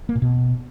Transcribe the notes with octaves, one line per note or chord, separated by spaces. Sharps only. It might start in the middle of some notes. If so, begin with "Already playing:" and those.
A#3
A#2
B2